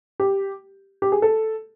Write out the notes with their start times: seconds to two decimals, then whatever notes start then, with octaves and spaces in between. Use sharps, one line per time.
0.20 G4
1.02 G4
1.12 G#4
1.22 A4